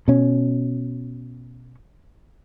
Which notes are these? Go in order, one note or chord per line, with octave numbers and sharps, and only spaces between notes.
B2 C#4